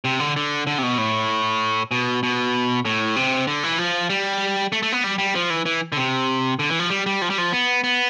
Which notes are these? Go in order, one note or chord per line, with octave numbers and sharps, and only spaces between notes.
C3
D3
D3
D3
C3
B2
A2
B2
B2
A2
C3
D3
E3
F3
G3
A3
A3
B3
G3
G3
F3
E3
E3
D3
C3
D3
E3
F3
G3
G3
F3
G3
F3
B3
B3